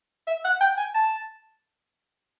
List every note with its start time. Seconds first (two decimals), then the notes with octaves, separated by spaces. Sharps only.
0.27 E5
0.45 F#5
0.61 G5
0.77 G#5
0.94 A5